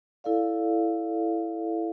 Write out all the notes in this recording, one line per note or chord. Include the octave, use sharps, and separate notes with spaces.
E4 A4 D5 F5